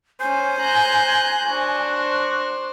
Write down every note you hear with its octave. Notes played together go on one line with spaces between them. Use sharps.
C#4 C5 G#5
A#5 F#6 G6
D4 F#4 C5